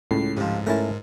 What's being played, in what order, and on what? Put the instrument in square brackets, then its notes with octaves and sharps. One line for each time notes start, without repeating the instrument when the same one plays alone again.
[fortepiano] C#2 [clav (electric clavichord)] A2 [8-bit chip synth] C7
[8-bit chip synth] G#2 [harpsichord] C3 F3
[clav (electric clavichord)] A3 C#4 E4 [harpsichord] A#4 A5